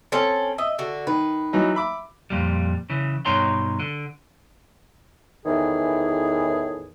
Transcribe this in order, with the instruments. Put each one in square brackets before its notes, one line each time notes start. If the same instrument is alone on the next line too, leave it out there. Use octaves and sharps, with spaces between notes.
[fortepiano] C4 [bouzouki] C#4 A4
[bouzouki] D#5 [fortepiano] E5
[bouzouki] D3 F#4
[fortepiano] D#3 [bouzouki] B4
[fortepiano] E3 F#3 D#4
E5 B5 D6
[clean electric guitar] F2 A#2 G3
C#3 E3
G2 B2 D#4 C#5 A#5 C6
D3
[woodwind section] E2 A2 D#3 E3 G#4